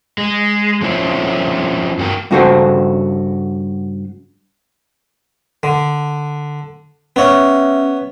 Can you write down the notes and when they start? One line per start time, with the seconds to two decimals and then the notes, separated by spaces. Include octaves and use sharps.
0.18 G#3
0.82 F3 C4 C#4 E4
1.99 G2 F#4 A#4 G5
2.31 G2 C#3 F#4 A4 C5
5.63 D3
7.16 B3 C#4 C#5 E5 F6